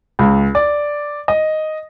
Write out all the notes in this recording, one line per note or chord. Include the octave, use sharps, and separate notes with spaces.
C#2
D5
D#5